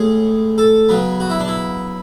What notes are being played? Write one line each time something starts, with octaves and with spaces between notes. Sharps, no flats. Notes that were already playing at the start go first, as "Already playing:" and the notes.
Already playing: A2 G#3 C#4 G#4
A4
C#3 F#3 B3
F#4
E4
D4
E4